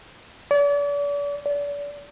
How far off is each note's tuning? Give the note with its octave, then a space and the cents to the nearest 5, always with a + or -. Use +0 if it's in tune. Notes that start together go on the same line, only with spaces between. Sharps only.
D5 -40
D5 -35